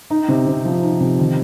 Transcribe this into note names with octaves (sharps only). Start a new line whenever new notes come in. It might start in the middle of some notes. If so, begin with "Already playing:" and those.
D#4
C3
C3
F3
D#4
C3
D#3